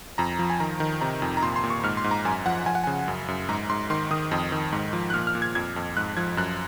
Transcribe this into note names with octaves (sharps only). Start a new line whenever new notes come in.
F2 A#5
F3
G#5
D#3 A#5
D#3
C3 A#5
F2
A#5
A#2 C6
C6
A#2
C#6
G#2 F6
C6
G#2
A#5
F#2 G#5
F3 F#5
F3 G#5
F#5
C#3 G#5
F#2
F#2
G#2 A#5
G#2 C6
D#3 C6
D#3 D#6
F2
D#3
G#2
F3
F#6
A#2 F6
F6
A#2
G#6
F2 G#6
F2
G#2 F#6
F3 G#6
F#2 F#6